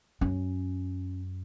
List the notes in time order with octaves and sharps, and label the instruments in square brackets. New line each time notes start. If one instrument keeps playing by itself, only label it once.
[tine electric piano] F#2 [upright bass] C#4